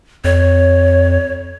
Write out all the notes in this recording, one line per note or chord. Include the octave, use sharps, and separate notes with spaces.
F2 C#5